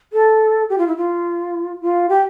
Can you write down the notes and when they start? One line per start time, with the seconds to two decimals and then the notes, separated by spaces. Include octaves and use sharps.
0.13 A4
0.69 G4
0.78 F4
0.87 E4
0.97 F4
1.81 F4
2.09 G4